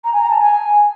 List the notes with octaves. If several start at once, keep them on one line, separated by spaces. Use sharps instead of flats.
A#5
G#5
A#5
A5
G#5